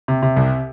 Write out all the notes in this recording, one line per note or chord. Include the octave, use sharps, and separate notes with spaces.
C3
C3
C2